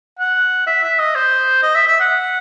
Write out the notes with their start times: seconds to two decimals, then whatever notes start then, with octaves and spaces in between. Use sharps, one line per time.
0.20 F#5
0.67 E5
0.83 E5
0.99 D#5
1.15 C5
1.63 D#5
1.75 E5
1.87 E5
2.00 F#5